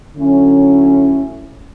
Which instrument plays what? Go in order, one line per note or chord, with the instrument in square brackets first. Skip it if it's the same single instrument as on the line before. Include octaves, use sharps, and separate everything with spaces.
[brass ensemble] D3 F#3 A3 C#4 E4